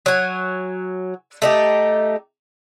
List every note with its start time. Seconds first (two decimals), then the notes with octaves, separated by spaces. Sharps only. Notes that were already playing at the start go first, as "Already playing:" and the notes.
0.06 F#3 G#5
1.42 A3 D#4 G4